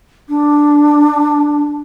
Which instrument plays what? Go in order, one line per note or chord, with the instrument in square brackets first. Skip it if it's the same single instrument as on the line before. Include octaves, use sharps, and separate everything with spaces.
[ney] D4